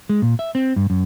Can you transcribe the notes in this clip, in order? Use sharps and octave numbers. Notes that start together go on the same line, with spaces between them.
G#3
A#2
E5
C4
G2
F#2